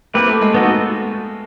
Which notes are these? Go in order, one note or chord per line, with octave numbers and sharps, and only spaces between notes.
A#3 C4 E4 G4 B4
A3
G#3
B3 D#4 F#4 A4